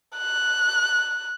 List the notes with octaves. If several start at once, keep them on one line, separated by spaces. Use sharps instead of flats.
F#6